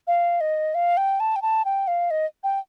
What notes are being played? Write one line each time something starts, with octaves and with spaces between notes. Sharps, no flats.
F5
D#5
F5
G5
A5
G5
A5
G5
F5
D#5
G5